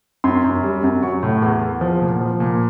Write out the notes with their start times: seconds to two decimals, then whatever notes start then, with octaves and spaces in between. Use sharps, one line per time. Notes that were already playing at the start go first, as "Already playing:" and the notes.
0.24 F#2 C6
0.44 F#2
0.63 G3
0.84 F#2
1.03 F#3 C#6
1.23 A2
1.42 E2
1.61 E2
1.81 F3
2.02 A#2
2.21 F3
2.40 A#2